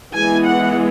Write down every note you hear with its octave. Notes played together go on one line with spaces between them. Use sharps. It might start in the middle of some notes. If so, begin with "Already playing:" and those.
E3 G#3 B3 G#5
F#5